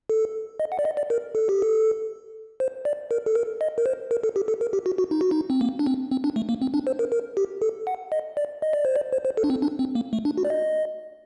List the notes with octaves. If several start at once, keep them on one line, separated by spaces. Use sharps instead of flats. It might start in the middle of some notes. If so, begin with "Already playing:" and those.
A4
D#5
F#5
D5
D#5
D5
A#4
A4
G4
A4
C5
D5
A#4
A4
A#4
D#5
A#4
C5
A#4
A4
G4
A4
A#4
G4
F#4
F#4
D#4
F#4
D#4
C4
A#3
D4
C4
C4
D4
A3
A#3
C4
D4
C5
A#4
A#4
G4
A4
F#5
D#5
D5
D#5
D5
C5
D5
C5
C5
A4
D4
C4
D4
C4
A#3
A3
D4
F#4
D5
D#5